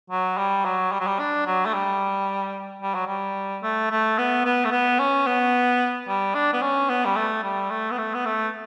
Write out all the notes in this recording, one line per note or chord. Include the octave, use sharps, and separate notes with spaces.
F#3
G3
F#3
G3
F#3
G3
D4
F#3
A3
G3
G3
F#3
G3
A3
A3
B3
B3
A3
B3
C#4
B3
G3
D4
B3
C#4
B3
G3
A3
G3
A3
B3
A3
B3
A3